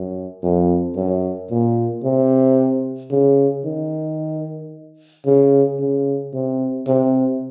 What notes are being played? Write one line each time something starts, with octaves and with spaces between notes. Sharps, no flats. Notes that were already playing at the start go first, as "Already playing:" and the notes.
Already playing: F#2
F2
F#2
A#2
C3
C#3
D#3
C#3
C#3
C3
C3